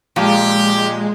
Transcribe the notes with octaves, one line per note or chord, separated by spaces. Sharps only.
A#2 F3 G#3 G4